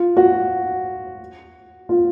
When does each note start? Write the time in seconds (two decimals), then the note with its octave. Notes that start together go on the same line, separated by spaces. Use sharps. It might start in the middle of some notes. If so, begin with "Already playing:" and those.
Already playing: F4
0.17 F#4
1.89 F4